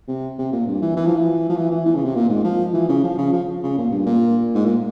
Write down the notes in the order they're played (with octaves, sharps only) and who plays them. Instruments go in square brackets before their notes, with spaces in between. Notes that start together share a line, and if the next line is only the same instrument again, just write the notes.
[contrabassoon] C3
C3
A#2
G2
E3
E3
F3
E3
F3
E3
E3
E3
C#3
C3
A#2
G#2
F3
E3
C#3
F3
C#3
F3
C#3
A#2
G2
A#2
G#2
A#2